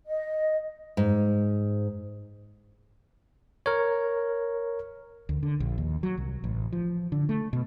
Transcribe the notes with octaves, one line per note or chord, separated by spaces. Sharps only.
D#5
G#2
A#4 C#5
D2
D3
A#1
D#2
F#3
C2
A1
F3
D3
A3
B2